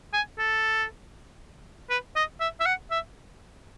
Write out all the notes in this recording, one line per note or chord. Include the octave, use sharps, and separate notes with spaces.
G#5
A4
B4
D#5
E5
E5
F#5
E5